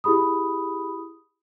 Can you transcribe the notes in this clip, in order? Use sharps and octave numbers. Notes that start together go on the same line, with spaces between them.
E4 G4 G#4 B5 D#6